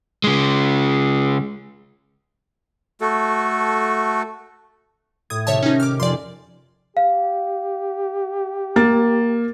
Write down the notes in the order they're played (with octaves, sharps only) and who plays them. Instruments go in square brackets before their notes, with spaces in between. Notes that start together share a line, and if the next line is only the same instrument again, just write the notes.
[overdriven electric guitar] C#3 G#3
[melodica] A3 F#4 A4
[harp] A2 [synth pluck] D#6 G#6
[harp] C3 D#3 [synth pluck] C#5 E5 A5
[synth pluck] C#4 D#4
D6 F6
[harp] F2 G#5 [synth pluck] D5 C6
[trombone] G4 [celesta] F5
[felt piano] A#3 A6